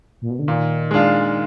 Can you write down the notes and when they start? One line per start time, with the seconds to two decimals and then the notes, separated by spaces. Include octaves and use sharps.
0.22 A#2
0.30 B2
0.39 D3
0.48 A#2 D#3
0.91 G#3 D4 F4